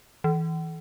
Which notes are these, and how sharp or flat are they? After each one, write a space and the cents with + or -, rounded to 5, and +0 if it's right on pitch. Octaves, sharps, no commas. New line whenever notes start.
E3 -25